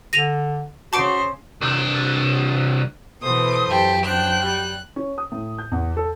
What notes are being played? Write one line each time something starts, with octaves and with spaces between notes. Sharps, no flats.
D3 A#6 D#7 F7
C#3 F#4 C5 A5 D6 D7
C2 D4
B2 E3 A3 C5 D#6
F#2 G4 A5
D4 C5 G5 F#6
G3
C#4
D#6
A2
G6
E2
A4